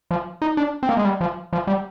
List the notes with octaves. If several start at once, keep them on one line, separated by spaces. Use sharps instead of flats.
F3
D#4
D4
C4
A#3
G#3
G3
F3
F3
G3